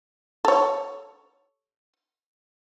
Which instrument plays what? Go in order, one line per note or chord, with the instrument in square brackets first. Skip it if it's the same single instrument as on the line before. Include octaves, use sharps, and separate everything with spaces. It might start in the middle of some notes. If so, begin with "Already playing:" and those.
[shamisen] A4 C#5